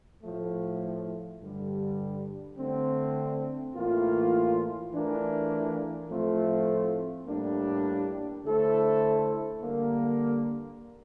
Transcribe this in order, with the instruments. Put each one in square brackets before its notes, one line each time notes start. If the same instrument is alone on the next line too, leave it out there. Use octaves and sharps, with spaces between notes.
[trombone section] A2 F3 A3
G2 D3 G3
D3 A3 C4
A2 E3 A#3 F4
E3 A3 D4 F4 A#4
A2 F3 A3 C4 F4
A2 G3 A#3 D4
D3 A3 E4 A4 C5
D3 G3 A#3